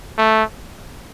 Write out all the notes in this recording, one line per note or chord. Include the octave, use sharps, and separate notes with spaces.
A3